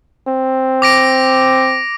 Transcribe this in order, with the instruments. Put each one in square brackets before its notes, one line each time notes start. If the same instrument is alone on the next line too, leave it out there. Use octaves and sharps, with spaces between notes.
[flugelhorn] C4
[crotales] D6 A#6 D7